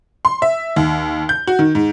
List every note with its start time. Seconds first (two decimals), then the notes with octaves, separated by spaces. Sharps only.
0.25 C6
0.42 E5
0.76 D#2
1.29 G6
1.47 F#4
1.59 D#3
1.75 G#2